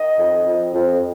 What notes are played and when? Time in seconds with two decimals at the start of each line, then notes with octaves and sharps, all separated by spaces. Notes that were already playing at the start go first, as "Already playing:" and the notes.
Already playing: D#3 D#5
0.17 F2
0.45 F2
0.73 F2